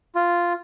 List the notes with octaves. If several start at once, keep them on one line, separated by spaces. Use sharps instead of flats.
F4